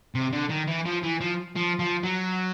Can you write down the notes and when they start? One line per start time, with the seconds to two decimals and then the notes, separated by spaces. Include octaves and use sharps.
0.15 C3
0.33 D3
0.50 D#3
0.68 E3
0.86 F3
1.03 E3
1.21 F3
1.56 F3
1.79 F3
2.03 F#3